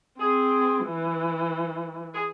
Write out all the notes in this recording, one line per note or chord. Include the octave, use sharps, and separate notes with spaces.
C4 G#4
E3
G#4